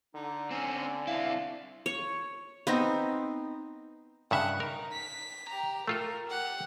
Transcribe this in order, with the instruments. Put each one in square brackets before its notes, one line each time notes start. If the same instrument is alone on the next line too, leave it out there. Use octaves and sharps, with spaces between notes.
[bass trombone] D3 [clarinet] D#4
[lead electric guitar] C4 C#4 [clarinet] G#5
[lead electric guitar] C4 E4 [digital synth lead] F5
[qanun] C#5
B3 C4 D#4
[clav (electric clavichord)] G2 C#3 E5 [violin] F#5
[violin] D#4 [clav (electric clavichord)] A#4
[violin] B6
G4 A#5
[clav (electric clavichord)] A3 F4 A4 [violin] A#4
[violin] G4 F#5